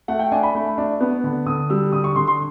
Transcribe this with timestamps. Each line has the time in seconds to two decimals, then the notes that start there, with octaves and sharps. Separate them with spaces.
0.08 A3 F#5
0.19 G5
0.32 D4 G#5
0.43 B5
0.55 A3
0.78 D4
1.01 B3
1.24 D3
1.46 D3 D#6
1.70 G3 E6
1.93 D3 D#6
2.04 C#6
2.16 D3 C6
2.27 C6